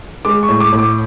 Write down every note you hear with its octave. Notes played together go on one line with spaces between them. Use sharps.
G#3 D6
C#6
A2
D6
A2
D6